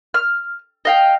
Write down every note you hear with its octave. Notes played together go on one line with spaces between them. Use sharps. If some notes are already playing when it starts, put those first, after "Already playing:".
F6
D#5 F5 G5